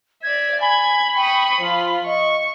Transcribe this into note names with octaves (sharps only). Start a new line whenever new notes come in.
D5 E5 G#6
G#5 B5 G#6
G5 C#6 D#6
F3 F4
D#5 C#6